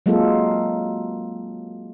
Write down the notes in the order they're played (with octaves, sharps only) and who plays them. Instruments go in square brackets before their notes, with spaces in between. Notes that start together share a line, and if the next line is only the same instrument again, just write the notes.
[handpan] F#3 G#3 A#3 C4 F4 A4